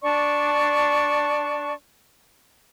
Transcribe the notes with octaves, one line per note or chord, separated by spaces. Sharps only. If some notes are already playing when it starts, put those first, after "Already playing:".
D4 D5 A5 C#6